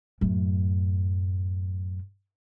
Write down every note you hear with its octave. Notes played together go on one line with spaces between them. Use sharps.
F#2 A2